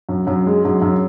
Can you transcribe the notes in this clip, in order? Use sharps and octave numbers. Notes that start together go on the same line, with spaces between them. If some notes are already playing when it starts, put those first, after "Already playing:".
F#2
F#2
G#3
F#2
F#2